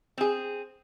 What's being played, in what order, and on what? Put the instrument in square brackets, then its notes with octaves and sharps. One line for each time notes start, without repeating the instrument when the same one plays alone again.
[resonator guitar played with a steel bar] C4 G#4